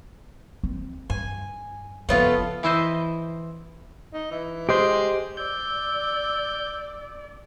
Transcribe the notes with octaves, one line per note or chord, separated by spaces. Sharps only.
C4
G2 G#5
F#1 F3 A3 B3 F4
E3 E4 C5 D#5
D#4
E3
G#3 G4 C5
D5 E6 G6